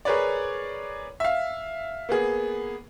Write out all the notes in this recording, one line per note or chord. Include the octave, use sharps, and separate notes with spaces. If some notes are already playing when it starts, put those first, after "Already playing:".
G#4 A#4 B4 C#5 D5
E5 F5
A#3 B3 G#4